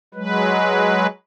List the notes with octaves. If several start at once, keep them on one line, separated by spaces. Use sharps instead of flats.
F#3 G#3 B4